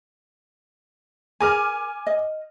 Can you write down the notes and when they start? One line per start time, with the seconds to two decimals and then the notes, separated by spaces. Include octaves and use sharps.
1.41 G#4 A#4 B4 G#5 D6 F6
2.07 D#5